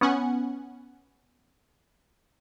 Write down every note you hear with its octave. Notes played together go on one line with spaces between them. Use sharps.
B3 C#4 F#5 G#5